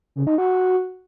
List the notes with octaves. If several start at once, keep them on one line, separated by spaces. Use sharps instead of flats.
C#3
D#4
F#4